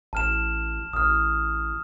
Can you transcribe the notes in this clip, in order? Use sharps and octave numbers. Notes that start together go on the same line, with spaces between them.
A1 A5 F6 E7
A1 D#6 F6